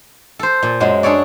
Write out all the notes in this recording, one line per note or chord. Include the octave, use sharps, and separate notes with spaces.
A4 C5
A#2
F#2 F#3 G#3
D4 G#4 A4 C#5 D5